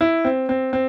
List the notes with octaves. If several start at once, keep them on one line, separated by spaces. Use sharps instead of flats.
E4
C4
C4
C4